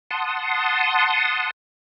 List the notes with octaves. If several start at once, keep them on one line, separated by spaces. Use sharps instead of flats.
F#5 A5 C6 D#6